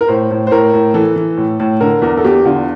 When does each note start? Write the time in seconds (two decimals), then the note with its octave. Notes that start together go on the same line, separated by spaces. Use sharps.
0.01 A#4
0.08 A2 C5
0.31 A2
0.47 C5
0.51 A2 A#4
0.73 A2
0.94 E3 A4
1.16 E3
1.37 A2
1.60 A2
1.80 D3 A#4
2.02 E2 A#4
2.17 A4
2.25 E2 G4
2.45 D3 F4